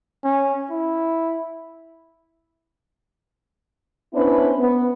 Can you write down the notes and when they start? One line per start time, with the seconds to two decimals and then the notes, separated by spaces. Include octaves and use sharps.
0.24 C#4
0.71 E4
4.14 B3 C#4 D4 E4 B4 C5
4.59 B3